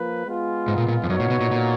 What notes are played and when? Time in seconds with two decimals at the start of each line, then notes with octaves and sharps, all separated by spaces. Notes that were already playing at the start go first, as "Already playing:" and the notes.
Already playing: F3 A#3 B4
0.25 G#3 B3 F4 G#4
0.68 G#2
0.78 A#2
0.88 A#2
1.03 F2
1.09 F#2 B3 D#4 F#4 C#5
1.20 A#2
1.30 B2
1.41 A#2
1.51 A#2